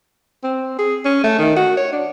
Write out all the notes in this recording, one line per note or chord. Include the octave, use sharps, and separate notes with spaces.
C4
G#4
C#4
A3
D#3
F#4
C#5
D4